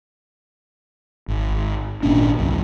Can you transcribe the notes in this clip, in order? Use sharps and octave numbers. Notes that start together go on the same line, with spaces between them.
G#1
G#1 A#2 C#4 D4
C2 F#2